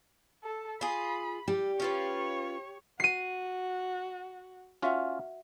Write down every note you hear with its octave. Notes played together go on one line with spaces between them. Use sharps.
A4
F4 G#4 B5
G3 G4
C#4 F4 B4 C#5
F#4 C7 D#7
C#4 F4 F#4 E5 F#5